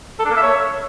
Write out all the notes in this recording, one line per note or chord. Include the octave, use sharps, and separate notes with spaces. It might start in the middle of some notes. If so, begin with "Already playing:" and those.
A4
D4
A#3
E5
C#5